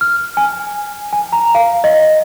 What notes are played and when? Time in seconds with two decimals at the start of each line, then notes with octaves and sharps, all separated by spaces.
0.01 F6
0.37 G#5
1.13 G#5
1.32 A#5
1.55 F5
1.84 D#5